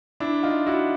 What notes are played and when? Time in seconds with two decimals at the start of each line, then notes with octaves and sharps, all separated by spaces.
0.20 D4 E4
0.43 D#4 F4
0.66 E4 F#4